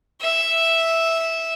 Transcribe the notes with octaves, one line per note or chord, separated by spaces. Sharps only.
E5